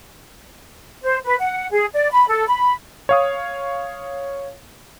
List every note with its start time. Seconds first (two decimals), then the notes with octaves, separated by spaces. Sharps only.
1.03 C5
1.24 B4
1.40 F#5
1.72 G#4
1.94 D5
2.11 B5
2.28 A4
2.48 B5
3.09 C#5 F5 D#6